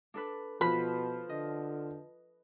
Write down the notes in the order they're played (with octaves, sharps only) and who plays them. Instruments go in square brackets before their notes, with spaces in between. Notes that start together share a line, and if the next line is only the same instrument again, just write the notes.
[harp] D4 A4 B4
[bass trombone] B2 [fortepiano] F3 [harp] B4 [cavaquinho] B5
[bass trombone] D3 [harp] D#5